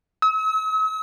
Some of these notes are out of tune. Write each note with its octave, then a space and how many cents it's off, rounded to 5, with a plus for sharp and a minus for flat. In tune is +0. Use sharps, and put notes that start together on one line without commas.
E6 -45